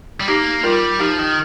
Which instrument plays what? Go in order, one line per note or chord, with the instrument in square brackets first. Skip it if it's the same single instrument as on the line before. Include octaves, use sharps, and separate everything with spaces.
[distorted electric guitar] G3
[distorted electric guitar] A#3 [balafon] D#4 G4
[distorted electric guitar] G3 [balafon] F4 A#4
[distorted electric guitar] F3 [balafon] D#4 G4
[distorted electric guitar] D#3